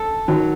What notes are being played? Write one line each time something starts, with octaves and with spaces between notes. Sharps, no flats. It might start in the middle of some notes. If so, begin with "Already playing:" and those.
Already playing: A4
D#3 F#3